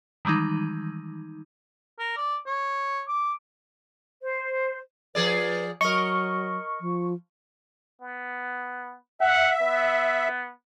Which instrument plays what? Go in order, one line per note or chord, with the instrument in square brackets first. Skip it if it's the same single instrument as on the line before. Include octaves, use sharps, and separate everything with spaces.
[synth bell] D#3 E3 G3 G#3 D#4
[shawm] A#4
D5
C#5
D6
[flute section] C5
[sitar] F3 G#4 D5 [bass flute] B4
[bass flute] F#3 [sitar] A#4 D#5 [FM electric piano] C#6
[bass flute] F3
[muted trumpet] B3
[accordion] E5 [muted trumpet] F#5
[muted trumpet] B3